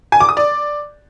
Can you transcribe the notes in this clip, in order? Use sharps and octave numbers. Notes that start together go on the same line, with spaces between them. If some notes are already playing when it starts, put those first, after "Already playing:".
G#5
D6
D#6
D5